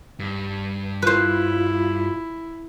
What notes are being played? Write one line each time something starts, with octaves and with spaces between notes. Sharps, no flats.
G2
E4 F4 B4 C5